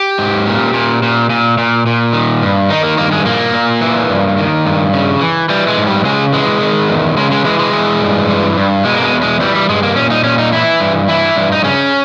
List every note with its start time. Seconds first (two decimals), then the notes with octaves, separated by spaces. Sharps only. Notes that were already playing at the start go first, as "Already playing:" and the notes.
Already playing: G4
0.18 G#2
0.46 A#2
0.73 A#2
1.03 A#2
1.30 A#2
1.58 A#2
1.86 A#2
2.13 D#3
2.42 G2
2.70 D#3 D#4
2.83 A#3
2.97 G2 A#3
3.12 G#3
3.25 A#2 A#3
3.54 A#2
3.81 E3
4.09 G2
4.38 D#3
4.66 G2
4.93 C#3
5.21 E3
5.49 E3 G3
5.68 G#3
5.77 G#2
5.87 G3
6.05 C#3 G#3
6.33 E3 G#3
6.61 D#3
6.89 E2
7.17 C#3 G#3
7.31 G#3
7.45 E3 G#3
7.59 G#3
7.72 E3
8.01 G2
8.29 E3
8.57 G2
8.85 B2 G#3
8.95 A#3
9.03 G#3
9.13 E2
9.23 G#3
9.41 E3 G3
9.55 G3
9.69 G2 G#3
9.83 A#3
9.96 A#2 C#4
10.11 D#4
10.24 A#2 C#4
10.39 D#4
10.52 E3 E4
10.80 G2
11.08 E3 E4
11.36 G2
11.52 D#4
11.64 C#3 C#4